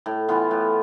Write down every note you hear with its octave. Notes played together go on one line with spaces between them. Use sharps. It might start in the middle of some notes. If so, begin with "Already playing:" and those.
A2
E3 B3 F4
A2